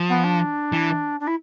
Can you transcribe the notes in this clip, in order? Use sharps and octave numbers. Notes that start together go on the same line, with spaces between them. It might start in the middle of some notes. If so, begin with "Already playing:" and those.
Already playing: F3
B3
D4
E3
D4
E4